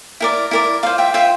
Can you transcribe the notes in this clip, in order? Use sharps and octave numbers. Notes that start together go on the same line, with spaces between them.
E4 A#4 D5
E4 A#4 D5
F4 C5 F5
E5 G5
F4 C5 E5 G5